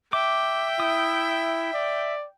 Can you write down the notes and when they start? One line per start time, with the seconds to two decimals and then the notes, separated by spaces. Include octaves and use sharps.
0.13 E5 G5 D6
0.80 E4 D#6
1.74 D5